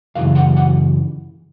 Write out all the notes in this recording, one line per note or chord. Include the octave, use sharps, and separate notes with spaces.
F#2 C#3 E3 F5
F#5
F#5